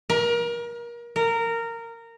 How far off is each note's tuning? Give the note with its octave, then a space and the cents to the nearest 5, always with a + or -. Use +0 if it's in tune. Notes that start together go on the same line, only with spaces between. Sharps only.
A#4 +30
A#4 -15